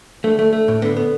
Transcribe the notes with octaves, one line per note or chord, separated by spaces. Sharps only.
D3 A3
A3
A3
A2
D3 B3
B3